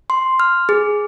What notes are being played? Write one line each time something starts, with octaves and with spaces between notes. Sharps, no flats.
C6
F6
G#4